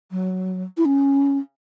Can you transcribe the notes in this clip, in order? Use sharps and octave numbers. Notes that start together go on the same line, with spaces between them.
F#3
E4
C#4